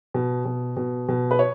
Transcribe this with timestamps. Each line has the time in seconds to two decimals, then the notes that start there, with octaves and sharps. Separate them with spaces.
0.14 B2
0.45 B2
0.77 B2
1.09 B2
1.31 B4
1.39 C#5